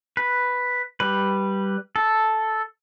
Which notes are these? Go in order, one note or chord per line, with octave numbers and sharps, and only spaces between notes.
B4
G3 B4
A4